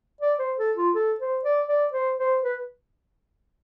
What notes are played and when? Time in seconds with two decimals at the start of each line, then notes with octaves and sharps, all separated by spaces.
0.21 D5
0.39 C5
0.58 A4
0.77 F4
0.95 A4
1.20 C5
1.44 D5
1.69 D5
1.93 C5
2.19 C5
2.43 B4